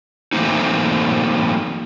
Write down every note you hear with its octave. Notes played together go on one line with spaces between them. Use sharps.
E3 F#3 A3 A#3 C4 D#4